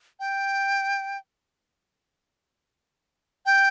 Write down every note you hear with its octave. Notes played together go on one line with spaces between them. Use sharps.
G5
G5